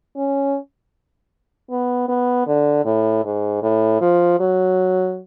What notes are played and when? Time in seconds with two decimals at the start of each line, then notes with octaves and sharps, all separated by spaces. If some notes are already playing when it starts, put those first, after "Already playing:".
0.16 C#4
1.70 B3
2.09 B3
2.47 D3
2.85 A2
3.25 G#2
3.63 A2
4.01 F3
4.40 F#3